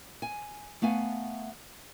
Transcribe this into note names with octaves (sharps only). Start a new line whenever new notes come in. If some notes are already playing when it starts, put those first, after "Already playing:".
G#5
A3 B3 F5 G#5